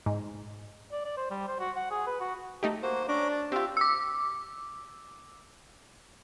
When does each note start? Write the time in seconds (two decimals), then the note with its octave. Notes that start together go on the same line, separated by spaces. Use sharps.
0.06 G#2
0.92 D5
1.05 D5
1.17 C5
1.31 G3
1.48 C5
1.59 F#4
1.76 F#5
1.91 G#4
2.07 B4
2.20 F#4
2.63 A3 D#4 G4
2.83 A#3 F#4 C5
3.08 C#4 D4 A#5 D6
3.32 A5
3.52 C4 F4 G4 E5
3.77 D6 E6